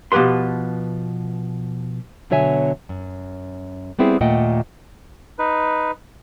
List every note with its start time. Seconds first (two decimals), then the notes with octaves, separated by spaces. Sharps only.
0.12 B2 F3 G4 B4 C6
2.30 B2 D3 F#3 C#5 E5 G#5
2.89 F#2
3.99 G3 B3 C4 E4 G#4
4.21 D#2 A#2 A3 D#5 F#5 G5
5.39 D#4 B4